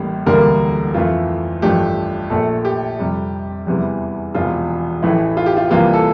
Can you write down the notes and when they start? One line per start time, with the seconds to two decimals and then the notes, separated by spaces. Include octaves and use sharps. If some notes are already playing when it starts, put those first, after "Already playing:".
Already playing: A1 A2 G3 A#3
0.26 E1 D2 D3 G3 A#3 A#4
0.94 F2 E3 A3 F4
1.62 A1 G2 F3 A3 G4
2.30 A#1 A#2 A3 A4
2.65 G4
2.99 F2 C3 G3
3.67 E2 C3 E3 G3
4.34 E1 E2 C3 F3 F4
5.02 A1 A2 E3 A3 E4
5.37 F4
5.46 G4
5.57 F4
5.70 C2 C3 E3 G3 A#3 F4
5.93 A4